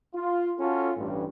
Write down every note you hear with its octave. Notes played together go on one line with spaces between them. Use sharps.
F4
C#4 F4 F#4 A4
A1 G2